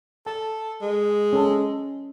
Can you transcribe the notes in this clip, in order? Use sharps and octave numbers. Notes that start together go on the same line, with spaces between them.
A4 A5
G#3
C#4 A4